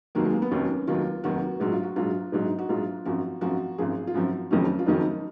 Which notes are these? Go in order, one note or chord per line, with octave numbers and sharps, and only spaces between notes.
F1 D#2 D#3 F#3 A#3
G#3
A#3
B3
F1 D#2 D#3 F#3 C#4
F1 D#2 D#3 F#3 F4
F1 D#2 D#3 F#3 F#4
A#1 G#2 F#3 F#4
F4
F#4
A#1 G#2 F#3 F4
A#1 G#2 F#3 D#4
F#4
A#1 G#2 F#3 F4
G#1 F#2 F3 F#4
G#1 F#2 F3 F#4
G#1 F#2 F3 G#4
F4
G#1 F#2 F3 F#4
F#1 F2 D#3 F#3 C#4
F4
F#1 F2 D#3 F#3 D#4